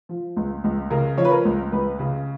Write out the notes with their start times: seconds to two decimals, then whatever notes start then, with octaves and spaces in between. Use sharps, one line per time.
0.09 F3
0.37 C#2
0.64 C#2
0.90 C#3 A#4
1.18 F3 C#5
1.25 B4
1.31 A#4
1.45 C#2
1.72 C#2 B4
1.99 C#3